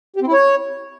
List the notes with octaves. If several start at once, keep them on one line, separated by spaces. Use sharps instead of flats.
G4
C4
E4
C#5